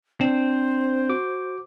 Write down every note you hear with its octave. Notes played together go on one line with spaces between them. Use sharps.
C4 D4 C5
F#4 D6